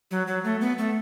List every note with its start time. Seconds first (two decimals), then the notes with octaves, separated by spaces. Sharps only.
0.11 F#3
0.27 F#3
0.44 A3
0.61 B3
0.78 A3